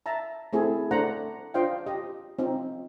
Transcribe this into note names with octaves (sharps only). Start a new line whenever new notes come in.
E5 A5 A#5
A3 C4 E4 F#4 G#4 A4
A3 D4 C5 F#5 A#5
D4 F4 C5 D#5 F5 G5
G4 D#5
C4 D#4 F4